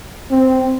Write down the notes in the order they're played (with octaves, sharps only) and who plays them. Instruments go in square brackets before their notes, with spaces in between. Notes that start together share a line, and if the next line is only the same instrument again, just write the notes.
[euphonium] C4